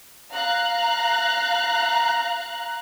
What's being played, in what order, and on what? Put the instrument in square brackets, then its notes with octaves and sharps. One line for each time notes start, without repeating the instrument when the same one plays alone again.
[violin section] F5 A#5 F#6